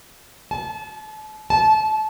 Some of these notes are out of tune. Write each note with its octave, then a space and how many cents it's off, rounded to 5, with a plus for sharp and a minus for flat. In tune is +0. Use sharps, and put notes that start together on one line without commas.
A5 -35
A5 -25